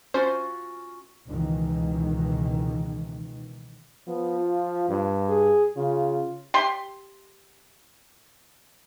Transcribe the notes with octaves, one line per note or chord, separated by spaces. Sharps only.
C#4 F4 F#4 C5
C#2 B2 D#3 E3
F3 B3
F4
G2
G#4
C#3 F4
G4 C6